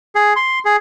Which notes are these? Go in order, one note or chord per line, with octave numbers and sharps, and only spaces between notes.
G#4
C6
G#4